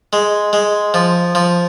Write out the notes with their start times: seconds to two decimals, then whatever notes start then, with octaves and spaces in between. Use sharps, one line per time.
0.13 G#3
0.53 G#3
0.94 F3
1.35 F3